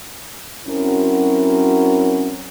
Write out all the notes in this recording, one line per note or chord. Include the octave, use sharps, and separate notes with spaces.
F#3 C4 C#4 E4 F#4 A#4